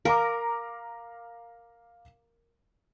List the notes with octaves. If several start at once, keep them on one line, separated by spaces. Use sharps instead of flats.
A#4 F5 A#5 D6